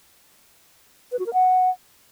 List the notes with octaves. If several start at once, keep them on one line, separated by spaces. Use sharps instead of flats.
B4
F#4
A#4
F#5